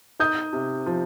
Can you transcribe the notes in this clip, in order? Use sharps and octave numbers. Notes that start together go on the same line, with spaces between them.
D#4 D#6 G6
C3
F3